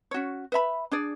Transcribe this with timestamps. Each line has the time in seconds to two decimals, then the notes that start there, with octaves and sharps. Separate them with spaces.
0.11 C#4 F#4 C#5
0.52 B4 E5 B5
0.91 D4 G#4 D5